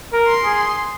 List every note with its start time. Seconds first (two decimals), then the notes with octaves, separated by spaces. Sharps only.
0.13 A#4
0.28 C6
0.44 G#4